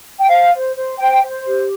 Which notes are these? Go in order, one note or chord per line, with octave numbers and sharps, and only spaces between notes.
G5
C5 F5
C5
C5
C5 G5
C5
G4